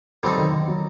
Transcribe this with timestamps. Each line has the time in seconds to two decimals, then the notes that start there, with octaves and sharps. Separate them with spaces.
0.23 D3 F#3 G3 C4 D#4 A4
0.38 D#3
0.53 D#3
0.68 F#3